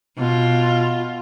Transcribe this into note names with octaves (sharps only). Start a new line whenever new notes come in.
B2 F4